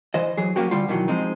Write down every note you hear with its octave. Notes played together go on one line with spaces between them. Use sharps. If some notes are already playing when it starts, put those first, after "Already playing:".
E3 C5 D#5
E3 F#3 G#4
F#3 A#3 C#4 F#4 G4
D3 G3 F4
B2 D#3 E3 F#3
F3 G#3 C4 D#4